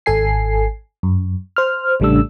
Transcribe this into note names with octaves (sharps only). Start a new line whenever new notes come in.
G#1 A4 G#5 C7
F#2
C5 F6
A1 C#3 G3 A3 D4 E6